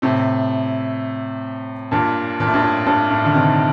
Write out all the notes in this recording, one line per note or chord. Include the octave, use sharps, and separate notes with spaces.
A2 C3
G2 A#2
A#2
A2
G2
A2
G2
A2
D3
C3 D#3